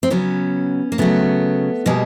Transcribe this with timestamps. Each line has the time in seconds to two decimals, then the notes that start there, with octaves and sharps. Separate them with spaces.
0.03 C4
0.10 C#3 F#3 B3 C#4
0.92 A#3
0.98 C#3 F#3 A3 B3
1.86 B2 G3 G#3 A#3